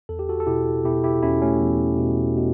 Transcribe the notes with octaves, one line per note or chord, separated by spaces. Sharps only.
E2 A4
G4
F#4 A4
A4
B2 E4 G4
B2 E4 G4
E4 G4
E2 C#4 E4
A3 C#4
E2
B2
B2